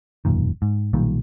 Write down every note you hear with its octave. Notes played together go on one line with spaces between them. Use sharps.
E1 F#2 A#2 D#3
G#2
B1 A#2 D#3 G3